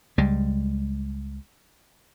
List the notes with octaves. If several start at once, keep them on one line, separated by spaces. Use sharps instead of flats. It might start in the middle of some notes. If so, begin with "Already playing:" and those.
C#2 G3 G#3